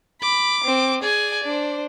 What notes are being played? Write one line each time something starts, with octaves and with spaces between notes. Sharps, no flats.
B5 D6
C4
G#4 D5 G#5
D4 C5